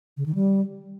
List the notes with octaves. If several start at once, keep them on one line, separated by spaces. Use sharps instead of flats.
C#3
D#3
G3